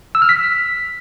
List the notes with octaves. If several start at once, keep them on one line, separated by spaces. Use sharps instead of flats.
E6
F6
B6